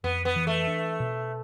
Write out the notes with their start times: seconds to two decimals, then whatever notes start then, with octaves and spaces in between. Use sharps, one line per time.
0.04 F2 B3
0.25 B3
0.36 E3
0.47 A3
0.67 D4
1.00 B2